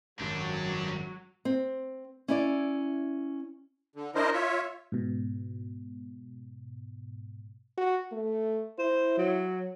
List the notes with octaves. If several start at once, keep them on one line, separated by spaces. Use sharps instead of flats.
G#1 F#2 F#3 G3 D4
C4
C#4 E4 D5
D3
D4 E4 A#4 C5 D#5
F4 C#5 E5
G#2 B2
F#4
A3
E4 C5
F#3